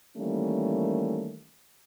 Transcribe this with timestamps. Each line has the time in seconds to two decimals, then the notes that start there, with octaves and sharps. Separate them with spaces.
0.17 D#3 E3 G3 A3 A#3 C#4